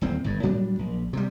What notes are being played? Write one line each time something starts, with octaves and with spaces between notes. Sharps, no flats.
D#1 E2 C4
G1 G2
A2 F#3 G3 D4
A#1
C3 G3